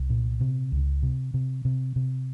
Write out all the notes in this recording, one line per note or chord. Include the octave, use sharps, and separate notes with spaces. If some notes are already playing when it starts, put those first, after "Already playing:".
Already playing: C2
A#2
C3
C#2
C3
C3
C3
C3